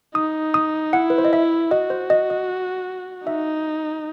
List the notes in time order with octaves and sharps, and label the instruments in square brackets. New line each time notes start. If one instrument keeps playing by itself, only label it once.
[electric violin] D#4 [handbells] D#6
[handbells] D#6
[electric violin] E4 [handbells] F#5
[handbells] B4
C5
D#5
E5
[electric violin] F#4 [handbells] D#5
[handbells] C5
D#5
D#5
[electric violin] D#4 [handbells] E5